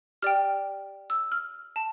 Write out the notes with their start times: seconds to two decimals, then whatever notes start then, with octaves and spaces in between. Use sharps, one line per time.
0.22 G4 D5 G5 F6
1.10 E6
1.32 F6
1.76 A5